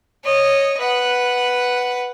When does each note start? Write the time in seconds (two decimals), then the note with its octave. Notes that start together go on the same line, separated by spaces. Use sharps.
0.24 C#5 D#5
0.79 B4 F#5